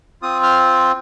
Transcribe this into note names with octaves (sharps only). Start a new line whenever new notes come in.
C4 F4 D#6
F6